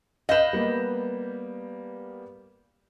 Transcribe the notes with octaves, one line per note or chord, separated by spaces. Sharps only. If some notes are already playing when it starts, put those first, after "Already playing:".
B4 D#5 F5 G6 E7
G3 A#3 B3